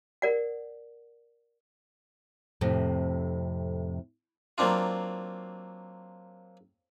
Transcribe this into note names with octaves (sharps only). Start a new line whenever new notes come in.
A#4 D5 F#5
F2 A2 C3
F#3 A#3 C4 D4 F4